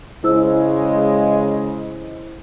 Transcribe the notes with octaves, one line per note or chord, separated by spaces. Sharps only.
C#3 G#3 E4 C5 E6